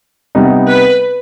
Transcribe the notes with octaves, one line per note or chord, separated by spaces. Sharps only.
C3 G3 B3 D#4 G4
B4